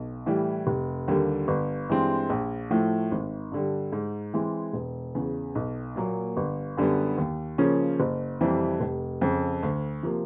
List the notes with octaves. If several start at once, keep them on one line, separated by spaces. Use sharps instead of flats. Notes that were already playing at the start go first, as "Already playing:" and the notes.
Already playing: B1
A2 E3 G3
F1
D#2 D3 G3 A#3
G1
G2 E3 G#3 C4
A#1
A2 F3 A3
G#1
G2 D3 G3
G#2
E3 G#3 C4
E1
E2 C#3
B1
A#2 F#3 A#3
G1
F#2 D3 G3 B3
D#2
C#3 F3 A#3 C#4
F#1
F2 C3 E3 G3
F1
F2 C#3
D2
C3 F3 A#3